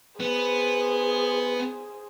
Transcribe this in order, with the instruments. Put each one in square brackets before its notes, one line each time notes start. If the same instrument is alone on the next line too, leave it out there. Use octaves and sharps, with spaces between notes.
[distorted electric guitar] B3 [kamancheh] G#4 C5